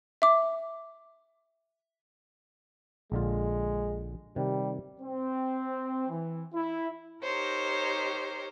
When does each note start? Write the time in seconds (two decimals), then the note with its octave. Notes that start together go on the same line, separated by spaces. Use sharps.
0.22 E5 D6
3.12 A#1 D3 G#3 F4
4.36 C3 D#3 G3
5.00 C4
6.09 E3
6.53 E4
7.23 D#4 G4 A#4 C5 C#5